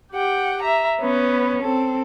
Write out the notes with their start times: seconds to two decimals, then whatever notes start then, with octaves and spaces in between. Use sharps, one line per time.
0.12 G4 F#5 G5
0.63 E5 A#5
0.99 B3 C#4 B4
1.62 C4 A4